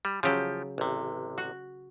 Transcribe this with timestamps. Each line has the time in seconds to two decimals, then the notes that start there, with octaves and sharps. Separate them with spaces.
0.05 G3
0.23 C#3 F3 F#3 G4
0.78 A1 C3
1.38 F#4